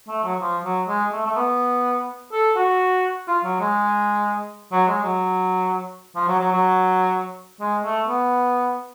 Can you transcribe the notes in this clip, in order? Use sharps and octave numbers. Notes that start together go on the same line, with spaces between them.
A3
F#3
F3
F#3
G#3
A3
A3
B3
A4
F#4
F4
F#3
G#3
F#3
G#3
F#3
F3
F#3
F#3
F#3
G#3
A3
B3